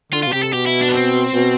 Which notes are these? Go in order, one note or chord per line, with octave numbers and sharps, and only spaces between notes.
D3 F4
B2 F4
C3 G4
A4
B2 G4
E4
D4
B3
C4
B2